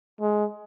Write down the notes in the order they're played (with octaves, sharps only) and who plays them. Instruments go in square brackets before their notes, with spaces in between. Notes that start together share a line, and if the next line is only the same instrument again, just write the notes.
[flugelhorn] G#3